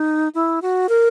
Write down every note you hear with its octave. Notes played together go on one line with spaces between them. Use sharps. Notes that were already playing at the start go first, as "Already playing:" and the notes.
Already playing: D#4
E4
F#4
A#4